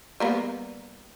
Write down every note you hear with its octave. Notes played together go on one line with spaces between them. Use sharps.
G3 A#3 B3